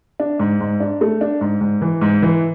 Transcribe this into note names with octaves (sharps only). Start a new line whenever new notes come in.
D4
G#2
G#2
D4
A3
D4
G#2
G#2
E3
G#2
E3